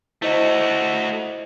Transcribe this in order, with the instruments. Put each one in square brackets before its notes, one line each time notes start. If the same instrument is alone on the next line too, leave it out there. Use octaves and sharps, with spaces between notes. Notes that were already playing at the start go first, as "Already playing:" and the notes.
[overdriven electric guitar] A3 F#4 [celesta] E4 C5 D#5